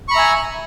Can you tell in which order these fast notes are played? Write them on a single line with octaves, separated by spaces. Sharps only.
C#6 B5 A#5 E5 G#5